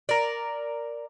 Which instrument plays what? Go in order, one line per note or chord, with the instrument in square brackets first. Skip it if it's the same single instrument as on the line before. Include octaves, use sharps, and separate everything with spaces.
[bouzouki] A#4 D5